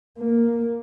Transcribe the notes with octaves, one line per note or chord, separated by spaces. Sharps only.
A#3